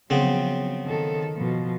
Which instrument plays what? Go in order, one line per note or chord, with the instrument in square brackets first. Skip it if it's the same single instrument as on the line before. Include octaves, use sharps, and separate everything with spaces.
[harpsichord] C#3 B3 C4 [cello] F3 F#3
[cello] D#3 A4
B2 F3